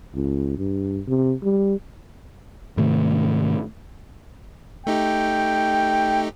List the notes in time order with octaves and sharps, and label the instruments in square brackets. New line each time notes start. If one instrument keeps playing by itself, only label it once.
[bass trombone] C#2
G2
C3
G3
[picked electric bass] G#2 C3 D#3 A3
[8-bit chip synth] A3 D#4 G4 [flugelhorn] G5